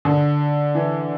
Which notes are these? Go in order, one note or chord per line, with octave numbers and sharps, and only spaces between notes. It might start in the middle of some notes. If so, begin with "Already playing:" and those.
D3
E3